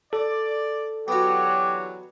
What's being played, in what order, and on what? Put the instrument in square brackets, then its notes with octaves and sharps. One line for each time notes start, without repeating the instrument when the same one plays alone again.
[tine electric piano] A4 [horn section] D5
[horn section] D3 E3 F#3 [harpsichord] B3 F#4 [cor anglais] G4